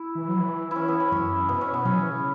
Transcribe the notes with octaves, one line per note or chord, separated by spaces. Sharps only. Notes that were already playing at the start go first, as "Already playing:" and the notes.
Already playing: E4
E3
F#3
E3
C#4 E4
B3
C#4
F#2 C#4
C#3
B2 B3
C#4
B3
F#3 C#4
E3
C#3